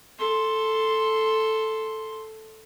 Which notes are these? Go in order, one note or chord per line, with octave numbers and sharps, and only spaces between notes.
A4 C6